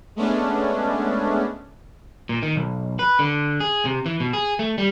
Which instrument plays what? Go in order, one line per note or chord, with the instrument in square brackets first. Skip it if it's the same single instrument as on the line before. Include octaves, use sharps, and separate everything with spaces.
[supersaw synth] G#3 A3 B3 C#4 D4
[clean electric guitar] A#2
D#3
B1
B4
D3
G#4
C3
E3
B2
G#4
A3
G3